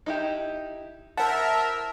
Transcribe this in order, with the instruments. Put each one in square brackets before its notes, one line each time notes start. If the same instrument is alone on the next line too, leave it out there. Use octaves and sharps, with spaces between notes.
[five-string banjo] D#4 E4 G4
[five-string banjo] E4 C5 F#5 [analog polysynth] A#4 E5 [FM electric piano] A5